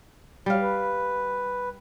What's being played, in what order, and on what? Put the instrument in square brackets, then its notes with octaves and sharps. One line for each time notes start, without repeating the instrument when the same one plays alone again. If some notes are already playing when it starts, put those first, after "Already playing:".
[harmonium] F#3 [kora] G3 F5
[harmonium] B4